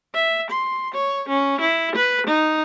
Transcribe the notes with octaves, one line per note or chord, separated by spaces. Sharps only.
E5
C6
C#5
C#4
E4
B4
D#4